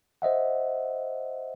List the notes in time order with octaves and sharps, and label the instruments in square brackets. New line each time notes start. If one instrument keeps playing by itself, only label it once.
[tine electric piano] C5 D#5 E5 F#5